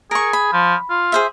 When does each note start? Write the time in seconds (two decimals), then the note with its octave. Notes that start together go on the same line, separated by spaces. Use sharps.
0.11 G#4 A#4 C#6
0.33 B5
0.53 F3
0.90 F4
1.12 G#4 C5 E5